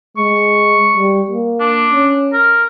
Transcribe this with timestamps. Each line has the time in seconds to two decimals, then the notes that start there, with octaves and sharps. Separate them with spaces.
0.17 G#3 C#6
0.97 G3
1.31 A#3
1.60 D4
1.90 C#4
2.33 A#4